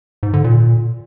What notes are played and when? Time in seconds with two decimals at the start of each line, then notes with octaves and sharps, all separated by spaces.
0.23 G#2
0.33 D3
0.44 A#2